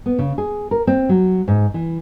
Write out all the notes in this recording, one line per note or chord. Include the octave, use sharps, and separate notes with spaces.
B3
C#3
G#4
A#4
C4
F#3
G#2
E3